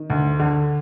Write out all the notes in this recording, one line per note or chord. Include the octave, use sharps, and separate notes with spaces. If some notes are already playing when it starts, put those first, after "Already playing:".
Already playing: D#3
D2
D3